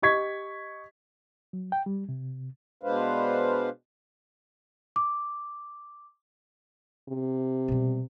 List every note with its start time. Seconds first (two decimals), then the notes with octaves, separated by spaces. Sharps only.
0.02 G4 D#5 C#6 G#6 B6
1.53 F#3
1.72 G5
1.86 G3
2.09 C3
2.83 B2 G#3 D4 B4 C5 F5
4.96 D6
7.09 C3
7.68 B2 G3